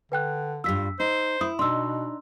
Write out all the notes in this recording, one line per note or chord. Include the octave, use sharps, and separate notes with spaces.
D3 B4 G5 F#6
G2 G3 F4 E6 B6
D#4 C5
E4 D#6
B2 D4 D#4 C6 E6